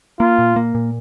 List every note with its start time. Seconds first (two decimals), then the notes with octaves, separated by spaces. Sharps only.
0.20 A#3 F4
0.39 A#2
0.56 A#3
0.75 A#2